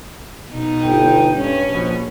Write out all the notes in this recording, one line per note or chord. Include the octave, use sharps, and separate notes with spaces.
B2 D#4
G1 G5
G2 C#4
A#1 B2